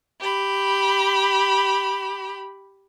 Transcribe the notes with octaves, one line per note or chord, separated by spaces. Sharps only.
G4 B5